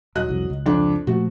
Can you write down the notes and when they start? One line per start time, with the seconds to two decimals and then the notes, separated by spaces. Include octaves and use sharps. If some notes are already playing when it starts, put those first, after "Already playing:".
0.15 D#1 F#3 D#5 F#6
0.29 C2 F2
0.50 C#2
0.66 F2 D4
1.07 A#2 F3 A3 F#4